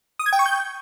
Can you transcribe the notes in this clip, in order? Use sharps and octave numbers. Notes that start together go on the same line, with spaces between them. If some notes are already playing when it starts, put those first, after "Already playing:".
D#6
G#6
G5
C#6
G6